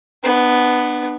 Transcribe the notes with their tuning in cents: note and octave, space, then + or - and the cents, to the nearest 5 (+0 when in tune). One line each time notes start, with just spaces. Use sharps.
B3 +0 D4 +40